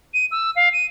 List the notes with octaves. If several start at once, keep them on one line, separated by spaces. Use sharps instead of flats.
D#7
E6
F5
D#7